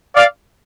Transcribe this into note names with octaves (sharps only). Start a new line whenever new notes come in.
D5 F5